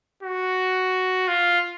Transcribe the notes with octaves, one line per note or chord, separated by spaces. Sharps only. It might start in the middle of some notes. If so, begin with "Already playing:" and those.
F#4
F4